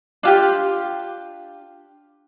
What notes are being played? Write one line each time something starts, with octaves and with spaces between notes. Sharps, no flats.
D4 F4 G4